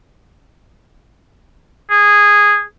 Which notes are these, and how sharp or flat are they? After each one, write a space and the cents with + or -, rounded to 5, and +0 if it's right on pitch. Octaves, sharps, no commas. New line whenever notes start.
G#4 -10